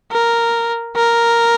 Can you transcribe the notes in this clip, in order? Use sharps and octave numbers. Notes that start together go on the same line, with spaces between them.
A#4
A#4